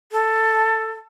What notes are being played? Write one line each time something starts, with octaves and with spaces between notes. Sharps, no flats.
A4